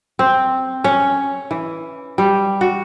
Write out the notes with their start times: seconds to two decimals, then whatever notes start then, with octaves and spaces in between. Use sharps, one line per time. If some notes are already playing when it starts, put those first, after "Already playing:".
0.19 C4
0.84 C#4
1.51 E3
2.18 G3
2.61 F#4